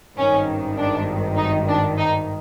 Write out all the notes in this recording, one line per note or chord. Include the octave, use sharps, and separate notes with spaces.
G#1 G2 D#3 C#4
D4
D#4
D4
D#4